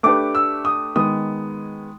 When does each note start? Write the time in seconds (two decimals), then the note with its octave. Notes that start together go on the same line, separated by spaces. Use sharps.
0.03 A3 D4 G4 B4 D6
0.35 E6
0.65 D#6
0.96 D#3 G#3 B3 D#6